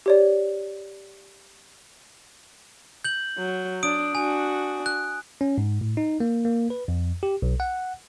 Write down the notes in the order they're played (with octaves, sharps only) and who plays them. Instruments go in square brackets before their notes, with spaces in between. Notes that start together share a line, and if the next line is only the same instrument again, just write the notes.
[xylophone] G4 C#5 D5
[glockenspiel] G6 F#7
[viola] F#3
[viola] D4 [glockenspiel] D#6 D7
[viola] D4 F#4 [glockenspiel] G#5
[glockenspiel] F#6
[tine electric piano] C#4
G#2
A2
D#4
A#3
A#3
B4
F2
G4
B1
F#5